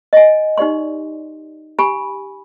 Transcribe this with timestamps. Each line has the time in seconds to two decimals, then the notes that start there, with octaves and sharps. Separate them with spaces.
0.13 D#5 G#5
0.58 D#4 G4 D5 C6
1.79 G4 G#5 B5